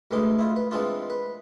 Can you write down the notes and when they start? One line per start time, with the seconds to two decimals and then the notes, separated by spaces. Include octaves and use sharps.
0.11 A1 D2 E3 G#3 C6 D6
0.39 E4 F4
0.56 B4
0.71 E3 G#3 C4 D4 F4
1.10 B4